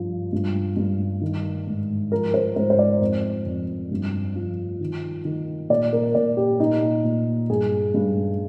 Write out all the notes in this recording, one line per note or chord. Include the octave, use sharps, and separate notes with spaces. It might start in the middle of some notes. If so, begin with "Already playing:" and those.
Already playing: G2 F3
G2
G2
D#3
G#2
F3 A#4
C5
G#2 C5
C5
D5
F2
F2
G2
F3
D#3
D#3
A#2 D5
A#4
A#2 D5
G4
A#2 D#4
A#2
G2 G#4
G2